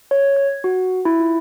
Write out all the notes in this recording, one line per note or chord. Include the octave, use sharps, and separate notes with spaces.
C#5
G#6
F#4
E4
F4